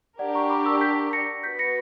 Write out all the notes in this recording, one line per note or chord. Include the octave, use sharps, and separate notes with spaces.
D4 G4 A#4 D5 F#5
A#5 C#6
B5 D6
C#6 E6
G6 B6
A#6 C#7
B3 F#4 B4 G6 B6
A#6 C#7